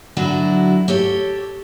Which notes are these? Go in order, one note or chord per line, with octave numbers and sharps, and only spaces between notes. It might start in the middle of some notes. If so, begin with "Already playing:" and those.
D3 F#3 D4 E4 F#4
G4 A4 C#5